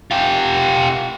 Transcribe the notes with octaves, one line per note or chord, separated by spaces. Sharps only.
F4 G4